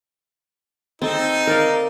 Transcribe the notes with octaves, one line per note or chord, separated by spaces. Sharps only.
C4 D#4 A4
A#4 D5 F5